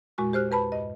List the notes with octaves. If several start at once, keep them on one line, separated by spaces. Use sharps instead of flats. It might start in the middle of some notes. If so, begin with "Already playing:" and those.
E2 A#2 G#3 F#4 C#6
G4 C5 F6 F#6
E2 B4 A5 B5
G2 D#5